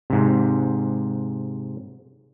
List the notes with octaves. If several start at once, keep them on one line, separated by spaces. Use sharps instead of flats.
G#2 C3